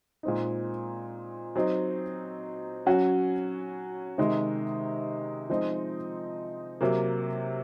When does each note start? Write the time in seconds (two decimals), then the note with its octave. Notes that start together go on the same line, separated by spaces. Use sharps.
0.23 A#2 G#3 C4 D#4
1.56 F#3 C4 D#4
2.86 F#3 C#4 F#4
4.18 C3 D#3 G#3 D#4
5.50 F3 G#3 C4 D#4
6.81 C3 F#3 A#3